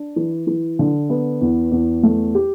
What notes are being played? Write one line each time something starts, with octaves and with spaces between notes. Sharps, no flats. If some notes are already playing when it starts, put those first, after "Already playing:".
Already playing: D4
E3
E3
D3
B3
E2
E2
A3
G4